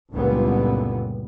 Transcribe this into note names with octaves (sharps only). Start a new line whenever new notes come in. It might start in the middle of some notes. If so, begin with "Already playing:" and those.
F#1 C#2 A#2 D3 G3 B3